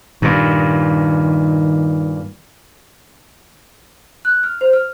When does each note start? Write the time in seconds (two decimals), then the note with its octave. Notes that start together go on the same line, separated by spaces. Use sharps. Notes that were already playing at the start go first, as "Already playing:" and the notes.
0.22 G2 A#2 D#3
4.25 F#6
4.43 F6
4.61 C5
4.73 F6